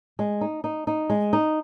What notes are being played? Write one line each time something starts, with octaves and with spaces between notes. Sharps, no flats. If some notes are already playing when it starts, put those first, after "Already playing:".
G#3
D#4
D#4
D#4
G#3
D#4